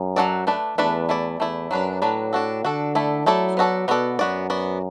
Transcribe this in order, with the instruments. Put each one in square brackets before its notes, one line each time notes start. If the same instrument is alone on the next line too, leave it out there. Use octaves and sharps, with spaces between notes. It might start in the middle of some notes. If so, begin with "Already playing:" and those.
Already playing: [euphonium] F#2
[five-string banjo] F#3 D4 F#4 A4 D5
A3 D4 B4 D5
[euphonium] E2 [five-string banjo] A3 D4 B4 D5
[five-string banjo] A3 E4 D5
[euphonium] E2 [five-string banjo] A3 E4 D5
[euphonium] F#2 [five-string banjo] F#3 D4 B4 D5
[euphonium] A2 [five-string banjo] F#3 D4 B4 D5
[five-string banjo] D4 F#4 A4
[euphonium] D3 [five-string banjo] D4 F#4 A4
[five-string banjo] A3 E4 A4 D5
[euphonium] F#3 [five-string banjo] A3 E4 A4 D5
[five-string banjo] B3 F#4 A4 D5
[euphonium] B2 [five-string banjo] B3 F#4 A4 D5
[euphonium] F#2 [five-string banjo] B3 F#4 D5
[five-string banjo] B3 F#4 D5